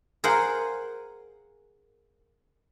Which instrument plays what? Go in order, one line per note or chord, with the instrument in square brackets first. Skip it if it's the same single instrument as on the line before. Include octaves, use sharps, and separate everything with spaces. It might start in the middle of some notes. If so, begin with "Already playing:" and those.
[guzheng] G#4 A#4 C5 F5 F#5